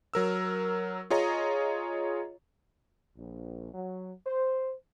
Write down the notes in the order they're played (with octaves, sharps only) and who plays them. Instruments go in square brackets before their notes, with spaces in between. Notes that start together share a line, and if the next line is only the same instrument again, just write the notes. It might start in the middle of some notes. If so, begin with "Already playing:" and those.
[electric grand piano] F#3 A#4 E6
F4 G#4 C#5 D#5 A#5
[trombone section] A#1
F#3
C5